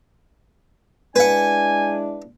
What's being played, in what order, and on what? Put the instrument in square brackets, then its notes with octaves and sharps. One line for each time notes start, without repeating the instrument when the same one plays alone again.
[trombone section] G#3 D4 E4 [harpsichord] B4 F#5 [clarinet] G#5